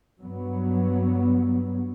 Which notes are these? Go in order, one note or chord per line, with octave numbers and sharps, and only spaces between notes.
G2 F#3 B3